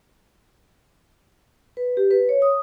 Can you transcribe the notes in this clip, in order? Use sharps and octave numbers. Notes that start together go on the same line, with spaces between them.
B4
G4
B4
C#5
D#6